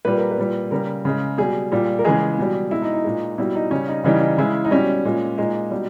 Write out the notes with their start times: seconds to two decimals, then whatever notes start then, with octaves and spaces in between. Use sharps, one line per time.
0.05 A#2 G3 B4
0.18 A#4
0.31 B4
0.38 A#2 G3
0.71 C#3 G3 A#4
1.05 C#3 G#3
1.38 B2 G3 G#4
1.72 A#2 G3
1.99 A#4
2.04 C#3 E3 G#3 G#4
2.38 B2 G3
2.71 B2 G#3 E4
2.82 D#4
2.94 D#4
3.04 A#2 G#3
3.38 B2 G3 E4
3.55 D#4
3.71 C#3 G3 C#4
3.88 D#4
4.04 C#3 E3 G3 D#4
4.21 D#4
4.38 C#3 G#3 E4
4.65 D#4
4.71 B2 G3 C#4
5.05 A#2 G#3
5.38 A#2 G#3 D#4
5.71 B2 G3